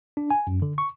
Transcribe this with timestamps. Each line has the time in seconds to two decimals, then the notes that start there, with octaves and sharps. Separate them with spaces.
0.17 D4
0.31 G#5
0.47 F#2
0.62 D3
0.78 C#6